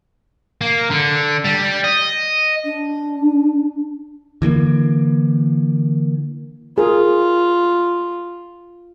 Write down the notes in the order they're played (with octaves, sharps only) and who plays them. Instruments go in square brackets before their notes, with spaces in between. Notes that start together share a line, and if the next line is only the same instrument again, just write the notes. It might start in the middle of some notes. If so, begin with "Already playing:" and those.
[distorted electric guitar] A#3
D3
G3
D#5
[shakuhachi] D4
[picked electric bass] D3 E3 G#3 A#3
[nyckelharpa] F4 [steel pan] G#4 A#4